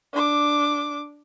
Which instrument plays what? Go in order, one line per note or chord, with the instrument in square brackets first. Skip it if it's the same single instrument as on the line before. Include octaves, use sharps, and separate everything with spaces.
[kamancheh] D4 D6